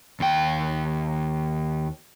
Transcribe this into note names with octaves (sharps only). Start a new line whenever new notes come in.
D#2 G5